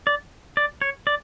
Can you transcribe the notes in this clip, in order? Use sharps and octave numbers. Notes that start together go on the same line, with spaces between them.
D5
D5
C#5
D5